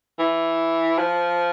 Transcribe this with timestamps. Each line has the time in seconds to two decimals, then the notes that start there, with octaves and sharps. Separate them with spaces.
0.19 E3
0.99 F3